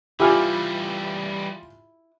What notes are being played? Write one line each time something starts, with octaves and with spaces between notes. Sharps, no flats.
E3 G3 E4 F4 G4 G#5 F6